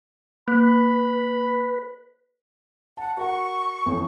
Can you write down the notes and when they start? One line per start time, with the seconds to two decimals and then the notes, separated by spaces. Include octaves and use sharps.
0.48 A#3 B4 B5
2.97 F#5 A5
3.17 F#4 A#4 F#5 C#6
3.86 A1 F2 A2